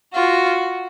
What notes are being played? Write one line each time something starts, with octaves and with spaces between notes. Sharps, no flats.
F4 F#4